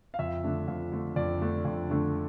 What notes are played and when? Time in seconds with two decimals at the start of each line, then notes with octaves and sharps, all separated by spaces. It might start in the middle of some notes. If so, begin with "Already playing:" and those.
0.14 F5
0.19 F2 E5
0.44 D3 A3 D4
0.68 F2
0.92 D3 A3 D4
1.16 F2 D5
1.40 D3 A3 D4
1.65 F2
1.90 D3 A3 D4